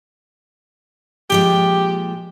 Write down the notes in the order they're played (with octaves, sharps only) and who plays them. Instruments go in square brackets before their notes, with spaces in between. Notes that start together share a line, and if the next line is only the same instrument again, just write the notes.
[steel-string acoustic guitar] A#2 F3 G#3 [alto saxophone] G4